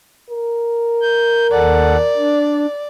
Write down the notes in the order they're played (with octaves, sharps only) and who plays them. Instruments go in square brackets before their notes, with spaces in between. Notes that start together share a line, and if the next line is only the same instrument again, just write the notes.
[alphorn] A#4
[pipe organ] G6
[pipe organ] D#2 A4 F#5 [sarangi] D5
[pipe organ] D4